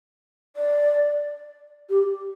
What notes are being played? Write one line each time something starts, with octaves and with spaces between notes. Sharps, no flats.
D5
G4